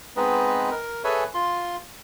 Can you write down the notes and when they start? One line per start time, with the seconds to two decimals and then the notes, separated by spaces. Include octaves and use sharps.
0.16 G#3 B3 C4 D#4 B4 D#5
0.71 A#4
1.04 G#4 A4 B4 C#5 E5 G#5
1.34 F4 C6